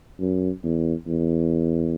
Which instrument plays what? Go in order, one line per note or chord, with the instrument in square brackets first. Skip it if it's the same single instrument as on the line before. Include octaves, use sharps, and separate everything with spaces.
[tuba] F#2
E2
E2